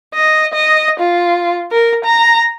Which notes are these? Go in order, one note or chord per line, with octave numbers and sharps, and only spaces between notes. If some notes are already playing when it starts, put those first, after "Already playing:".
D#5
D#5
F4
A#4
A#5